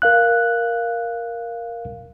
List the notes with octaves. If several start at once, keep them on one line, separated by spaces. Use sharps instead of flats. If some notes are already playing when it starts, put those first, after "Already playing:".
A#4 F5 F#6